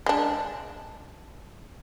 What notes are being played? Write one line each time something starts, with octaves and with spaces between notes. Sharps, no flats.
G#3 D4